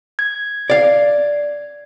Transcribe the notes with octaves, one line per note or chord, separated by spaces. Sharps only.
G#6
D5 F5